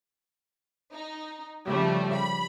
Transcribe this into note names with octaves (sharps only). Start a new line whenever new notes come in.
D#4
C#3 F3 G3 A3
B5